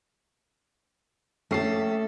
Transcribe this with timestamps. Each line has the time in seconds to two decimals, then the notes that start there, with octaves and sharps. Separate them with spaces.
1.51 A#1 A3 C#4 A4 C7